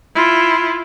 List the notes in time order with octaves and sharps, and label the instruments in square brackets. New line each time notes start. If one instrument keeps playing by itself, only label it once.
[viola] E4 F4